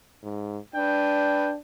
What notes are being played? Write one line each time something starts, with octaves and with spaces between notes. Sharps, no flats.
G#2
D4 B4 G5